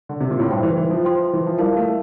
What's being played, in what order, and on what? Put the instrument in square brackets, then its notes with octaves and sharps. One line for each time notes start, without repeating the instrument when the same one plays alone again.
[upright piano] D3
C3
A#2
A2
[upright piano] G2 [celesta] C5 G5 C6
[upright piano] E3
E3
F3
[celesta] C5 G5 C6
[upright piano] E3
F3
[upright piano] G3 [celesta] E4 A#4 F5 A5
[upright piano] A3